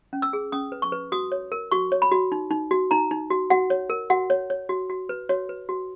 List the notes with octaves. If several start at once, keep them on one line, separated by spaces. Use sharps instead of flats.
C#4
E6
G#4
C#4 D#6
B4
C#6
B4
F#4 D#6
C#5
A#4
F#4 C#6
C#5
B5
F#4
D#4
D#4
F#4
D#4 A#5
D#4
F#4
F#4 F#5
C#5
A#4
F#4 F#5
C#5
C#5
F#4
F#4
B4
F#4 C#5
B4
F#4